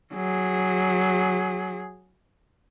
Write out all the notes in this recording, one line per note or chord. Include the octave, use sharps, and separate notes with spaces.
F#3 G#4